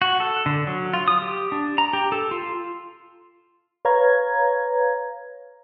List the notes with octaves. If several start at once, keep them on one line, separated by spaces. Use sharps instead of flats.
F#4
A4
D3
F#3
F4
D#6
G4
D4
A#5
G4
A4
F4
B4 C#5 F5 A#5 G#6